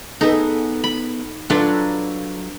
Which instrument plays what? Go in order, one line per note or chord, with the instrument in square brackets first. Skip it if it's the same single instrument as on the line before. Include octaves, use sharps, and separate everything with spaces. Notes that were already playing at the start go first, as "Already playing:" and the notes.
[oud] B3 G#4 A4 [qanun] D#4
[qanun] B5
[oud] F#3 F4 A4 [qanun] D4 B4